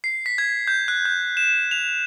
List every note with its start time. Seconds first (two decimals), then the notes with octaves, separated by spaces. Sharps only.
0.04 C7
0.26 B6
0.38 G#6
0.68 G6
0.88 F#6
1.05 G6
1.37 E7
1.71 F7